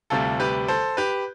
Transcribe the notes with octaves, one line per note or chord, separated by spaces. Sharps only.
D2 C3 G3 F4 A4
G4 B4
A4 C5
G4 B4